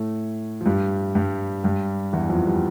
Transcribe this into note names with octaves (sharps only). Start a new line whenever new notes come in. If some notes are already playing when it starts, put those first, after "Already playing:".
Already playing: A2 A3
F3
G2 G3
G2 G3
G2 G3
E2 E3
F2 F3
G3